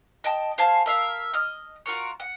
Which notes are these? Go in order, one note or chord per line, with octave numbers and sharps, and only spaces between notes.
D#5 G5 A5
C5 F5 G#5 A5
A#4 E5 F5
D#5 F6
F4 F#4 A#4 C#5
F#5